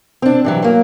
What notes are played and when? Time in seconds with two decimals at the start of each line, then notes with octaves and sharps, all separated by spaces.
0.22 C4 D4
0.44 G2 E3 F#3
0.62 F#3 A#3